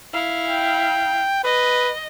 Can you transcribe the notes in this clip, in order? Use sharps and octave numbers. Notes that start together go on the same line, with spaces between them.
E4 F5
G5
B4 D#5